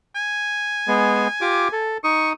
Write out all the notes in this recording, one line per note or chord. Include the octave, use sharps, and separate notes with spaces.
G#5
G#3 B3
F4 G4 D6
A4
D#4 C#6 D#6